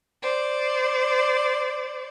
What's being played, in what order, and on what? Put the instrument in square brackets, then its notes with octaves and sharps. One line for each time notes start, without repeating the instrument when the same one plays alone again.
[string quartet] C5 D5